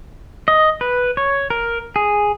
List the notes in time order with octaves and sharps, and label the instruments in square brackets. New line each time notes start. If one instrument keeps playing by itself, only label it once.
[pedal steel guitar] D#5
B4
C#5
A#4
G#4